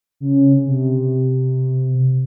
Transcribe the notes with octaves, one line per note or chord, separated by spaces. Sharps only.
C#3
C3